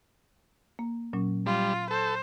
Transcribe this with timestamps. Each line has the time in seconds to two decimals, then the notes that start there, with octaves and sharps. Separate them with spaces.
0.79 A#3
1.13 A#2 F#3 C#4
1.46 G3 F4
1.91 A4 C5